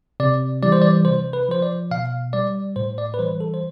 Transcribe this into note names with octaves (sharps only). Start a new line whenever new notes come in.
C3 D5
E3 G3 D5
C5
D5
C3 C5
B4
F3 C5
D5
B2 F5
G3 D5
A2 C5
D5
B4
E3 G3 C5
A4
C5